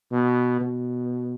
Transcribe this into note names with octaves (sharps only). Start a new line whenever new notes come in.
B2
B2